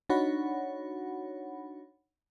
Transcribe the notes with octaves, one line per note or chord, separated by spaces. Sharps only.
D4 D#4 F#4 C#5 F#5 B5